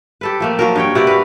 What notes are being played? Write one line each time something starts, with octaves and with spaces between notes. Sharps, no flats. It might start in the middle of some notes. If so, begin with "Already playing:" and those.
G4 A4 B4
F3 A3 A#3
F3 F#3 A#4
G2 C#5 G5
C3 F#4 B4 D5
B4 F5